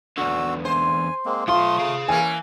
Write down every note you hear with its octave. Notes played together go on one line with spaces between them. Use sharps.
E2 D3 F#4 E6
C5 G#5
G#3 A#3 C4
B1 A3 F4 C6 D#6
G#4 F5
E3 A#3 C#4 G#5